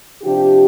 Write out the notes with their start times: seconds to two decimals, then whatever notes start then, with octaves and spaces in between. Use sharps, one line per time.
0.23 C3 F3 D4 G4